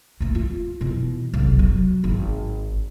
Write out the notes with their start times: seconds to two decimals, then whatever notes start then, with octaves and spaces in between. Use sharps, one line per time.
0.21 A3 A#3
0.35 F4
0.81 B2 E3
1.34 F1 B1
1.59 F#3
2.04 G#1